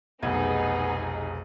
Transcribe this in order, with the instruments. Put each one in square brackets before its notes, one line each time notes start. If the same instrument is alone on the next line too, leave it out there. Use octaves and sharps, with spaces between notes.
[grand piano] F1 B1 G#6 [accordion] B3 [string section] D#4 G#4